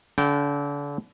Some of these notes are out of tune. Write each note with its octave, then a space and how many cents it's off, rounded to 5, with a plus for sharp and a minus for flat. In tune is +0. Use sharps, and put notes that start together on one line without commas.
D3 -35 G5 -25